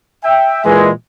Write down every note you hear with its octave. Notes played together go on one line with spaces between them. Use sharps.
E5 G5
A#2 E3 G#3